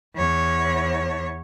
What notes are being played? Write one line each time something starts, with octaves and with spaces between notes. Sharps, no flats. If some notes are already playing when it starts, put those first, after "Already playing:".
E2 C#5